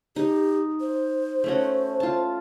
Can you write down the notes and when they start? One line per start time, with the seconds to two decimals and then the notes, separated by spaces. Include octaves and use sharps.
0.16 D#4 G4
0.81 C5
1.44 A3 C#4 F#4
2.00 F4 A5